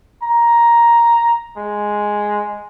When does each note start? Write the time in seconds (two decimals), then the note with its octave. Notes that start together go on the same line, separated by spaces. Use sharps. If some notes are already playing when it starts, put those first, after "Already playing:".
0.22 A#5
1.57 G#3